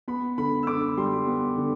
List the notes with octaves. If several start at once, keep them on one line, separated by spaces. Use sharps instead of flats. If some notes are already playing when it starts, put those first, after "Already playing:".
B3 B5
D3 B5
E6
D3 D6
G3 C6
B3
D3